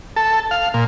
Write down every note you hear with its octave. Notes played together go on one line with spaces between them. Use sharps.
A4
F5
A#2